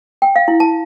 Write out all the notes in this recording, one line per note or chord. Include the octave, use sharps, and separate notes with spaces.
G5
F5
E4
A5